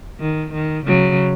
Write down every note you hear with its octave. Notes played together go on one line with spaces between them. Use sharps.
D#3
D#3
C#3 F#3